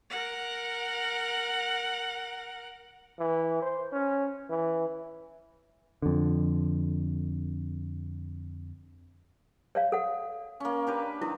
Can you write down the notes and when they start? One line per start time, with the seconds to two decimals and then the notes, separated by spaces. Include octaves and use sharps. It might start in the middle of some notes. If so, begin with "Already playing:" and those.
0.10 A#4 F#5
3.19 E3
3.62 C5
3.92 C#4
4.50 E3
6.02 F2 D3
9.75 C#5 D5 F5
9.92 A4 F#5
10.60 A#3 C#4
10.87 D4 G4 B4
11.21 D#3 E4